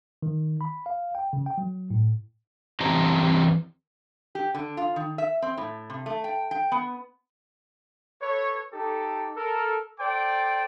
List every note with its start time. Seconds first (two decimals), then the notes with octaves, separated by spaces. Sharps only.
0.22 D#3
0.61 B5
0.86 F5
1.15 G5
1.33 C#3
1.46 G5
1.58 F#3
1.90 A2
2.80 E3 C4 G4 D#5 A5 A#5
4.35 G4
4.54 D3
4.77 F4
4.96 D#3
5.18 E5
5.42 C4
5.57 A2
5.90 C3
6.06 A3
6.24 G5
6.51 G5
6.72 B3
8.22 A4 B4 C#5
8.73 D#4 G4 A4
9.36 A4 A#4
9.99 A4 C5 D5 G5 D6